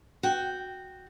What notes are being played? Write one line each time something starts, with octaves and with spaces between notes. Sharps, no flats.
F#4 G5